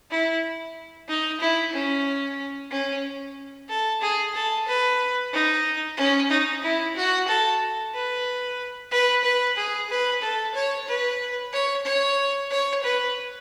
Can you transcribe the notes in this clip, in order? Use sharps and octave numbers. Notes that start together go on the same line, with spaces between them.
E4
D#4
E4
C#4
C#4
A4
G#4
A4
B4
D#4
C#4
D#4
E4
F#4
A4
B4
B4
B4
G#4
B4
A4
C#5
B4
C#5
C#5
C#5
B4